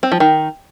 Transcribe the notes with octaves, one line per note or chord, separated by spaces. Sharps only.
C4
F3
D#3